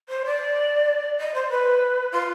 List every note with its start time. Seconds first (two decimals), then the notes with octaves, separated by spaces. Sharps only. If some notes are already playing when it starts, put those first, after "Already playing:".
0.08 C5
0.25 D5
1.18 D#5
1.34 C5
1.49 B4
2.12 F4